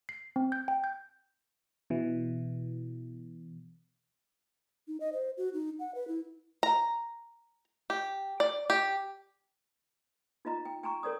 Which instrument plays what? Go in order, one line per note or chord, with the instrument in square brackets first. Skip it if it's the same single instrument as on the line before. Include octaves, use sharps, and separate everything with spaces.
[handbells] C7
C4
G6
G5
G6
[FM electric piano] B2 E3
[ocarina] D#4
D#5
C5
F#4
D#4
F#5
B4
E4
[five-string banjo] A#5
G4
D5
G4
[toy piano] D#4 F4 D#5 A#5
G5
G5 G#5 A#5 C#6
A4 A#4 C#5 D5 D#6